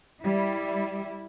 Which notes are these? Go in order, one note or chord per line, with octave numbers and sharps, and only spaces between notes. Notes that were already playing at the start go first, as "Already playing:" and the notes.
G3 E4